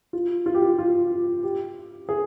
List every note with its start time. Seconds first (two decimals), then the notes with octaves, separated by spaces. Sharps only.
0.13 F4
0.46 F4
0.55 G4
0.62 F4
0.79 F4
1.43 G4
2.09 G#4